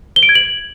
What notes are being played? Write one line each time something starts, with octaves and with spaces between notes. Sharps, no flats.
G7
D7
G#6
F#7